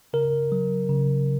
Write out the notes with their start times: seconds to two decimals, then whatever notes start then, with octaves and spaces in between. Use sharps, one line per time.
0.13 C#3 A#4
0.52 F#3
0.89 C#3